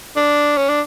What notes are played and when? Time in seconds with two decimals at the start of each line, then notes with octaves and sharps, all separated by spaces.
0.16 D4
0.57 C#4
0.69 D4